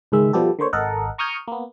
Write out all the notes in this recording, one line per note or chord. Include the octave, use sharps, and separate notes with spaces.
C#2 G#2 D#3 G#3 E5
B2 F3 G3 B3 G4 A4
D3 A#3 C5 C#5
G#1 A4 A#4 D#5 F#5
A#5 C#6 D#6 F6 G6 G#6
A#3 B3